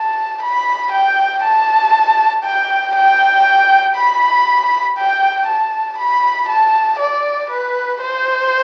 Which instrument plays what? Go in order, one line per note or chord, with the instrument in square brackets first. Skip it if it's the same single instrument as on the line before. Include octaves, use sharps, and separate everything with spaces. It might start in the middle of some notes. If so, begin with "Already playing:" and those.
Already playing: [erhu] A5
B5
G5
A5
G5
G5
B5
G5
A5
B5
A5
D5
B4
C5